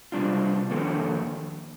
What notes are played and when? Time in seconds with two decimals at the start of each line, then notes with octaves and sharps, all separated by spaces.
0.12 C3 G3 D4 F4
0.70 F2 D#3 A#3 D4 A4